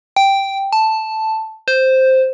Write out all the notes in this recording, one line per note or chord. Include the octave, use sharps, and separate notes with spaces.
G5
A5
C5